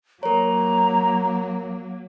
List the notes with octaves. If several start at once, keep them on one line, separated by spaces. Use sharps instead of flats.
F#3 A#3 A#4 C#5 A#5